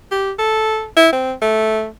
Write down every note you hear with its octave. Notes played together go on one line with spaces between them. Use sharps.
G4
A4
E4
C4
A3